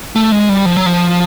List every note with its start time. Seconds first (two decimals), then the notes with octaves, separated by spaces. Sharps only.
0.15 A3
0.32 G#3
0.49 G3
0.66 F3
0.77 F#3
0.86 F3